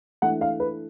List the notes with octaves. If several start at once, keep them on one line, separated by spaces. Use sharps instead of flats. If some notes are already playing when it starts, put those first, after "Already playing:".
E3 A3 D4 F#5
F5
B4